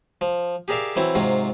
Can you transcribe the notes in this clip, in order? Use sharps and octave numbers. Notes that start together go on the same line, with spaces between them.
F3
G4 G#4 A#4 D5 E5 F5
E3 F#3 C4 E4
G#2 C3 F#3 F4